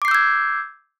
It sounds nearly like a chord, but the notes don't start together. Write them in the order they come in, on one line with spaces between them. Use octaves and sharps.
D6 C7 G6 E6 G#6